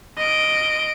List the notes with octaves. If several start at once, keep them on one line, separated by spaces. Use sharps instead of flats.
D#5 D7